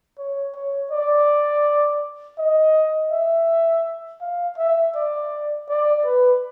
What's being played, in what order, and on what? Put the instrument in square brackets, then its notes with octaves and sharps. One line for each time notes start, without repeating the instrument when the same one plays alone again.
[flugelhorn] C#5
C#5
D5
D#5
E5
F5
E5
D5
D5
B4